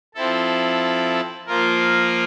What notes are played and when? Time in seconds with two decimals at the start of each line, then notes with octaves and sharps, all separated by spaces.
0.14 F3 C4 E4 A4
1.46 F3 A#3 F4 A#4